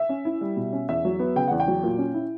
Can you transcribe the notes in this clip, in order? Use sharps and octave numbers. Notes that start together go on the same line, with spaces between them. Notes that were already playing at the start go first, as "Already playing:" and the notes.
Already playing: E5
C#4
E4
G3
B2
C#4
E2 E5
F#3
B3
C#3 G5
E2 F#5
G5
F#3
A#2
C#4
E4